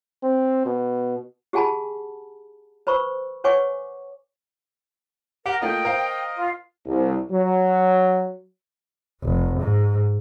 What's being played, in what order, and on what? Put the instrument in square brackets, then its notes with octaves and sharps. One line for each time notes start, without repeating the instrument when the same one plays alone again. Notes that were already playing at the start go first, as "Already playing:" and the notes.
[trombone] C4
B2
[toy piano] G4 G#4 F#5 G#5 A5 B5
B4 C5 B5 C#6 E6
B4 C#5 F#5 G#5 C#6 D6
[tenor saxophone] G4 [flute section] A#4 [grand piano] F#5
[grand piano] A3 A#3 F4 [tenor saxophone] D#5 [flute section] G5
[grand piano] A#4 C5 F5
[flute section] F4
[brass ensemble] C2
F#3
[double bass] F1
G#2